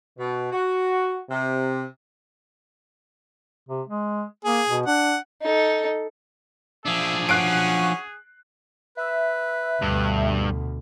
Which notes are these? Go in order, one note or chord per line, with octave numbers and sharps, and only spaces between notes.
B2
F#4
C3
C3
G#3
A#3 G#4
B2
D4 F#5
D#4 A4
F3 D4 G#4 E5
C#4 F#4 F#6 C7 D7
B4 E5
D2 G2 B2